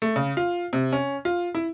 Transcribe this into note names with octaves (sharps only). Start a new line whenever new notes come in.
A3
C#3
F4
C3
C#4
F4
E4